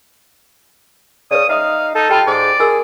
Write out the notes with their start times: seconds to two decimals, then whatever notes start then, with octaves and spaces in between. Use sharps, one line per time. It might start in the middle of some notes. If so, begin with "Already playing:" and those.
1.31 C#3 B4 D5 D#6
1.49 D#4 E5 F5 D6 D#6
1.95 D#4 A4
2.10 F4 G4 G5 B5
2.27 G#2 D5
2.60 F#4 G#4 A#4 E6